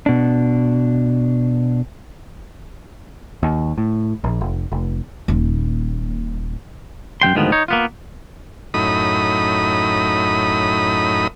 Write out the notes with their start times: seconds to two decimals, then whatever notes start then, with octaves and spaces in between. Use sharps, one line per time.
0.06 B2 D4
3.43 D#2
3.78 A2
4.24 A#1
4.41 F1
4.72 F1
5.28 D#1 A#2
7.22 F#2 F#3 G5 C6
7.35 D2 G#2 D#3 F3 B3
7.52 D#4 C#5
7.68 A#3 B3 F4
8.74 F#2 A2 D#4 B5 D#6